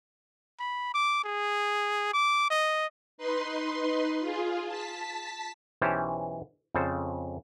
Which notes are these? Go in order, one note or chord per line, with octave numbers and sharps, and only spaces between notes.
B5
D6
G#4
D6
D#5
D#4 B4 C6
F4 G#4
A5 B6
B1 E3 C#4 G4 C5 A5
F2 C#3 A4 C5